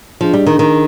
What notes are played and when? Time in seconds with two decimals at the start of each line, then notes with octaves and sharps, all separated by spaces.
0.21 F3 D4 G#4 D#5
0.34 G3
0.46 D#3
0.59 D#3